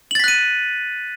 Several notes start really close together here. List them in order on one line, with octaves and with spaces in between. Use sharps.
F#7 A6 B6 F#6 D#7